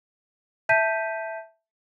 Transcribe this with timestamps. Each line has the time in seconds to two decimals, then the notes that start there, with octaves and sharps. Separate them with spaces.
0.69 E5 A5 G6 B6 D#7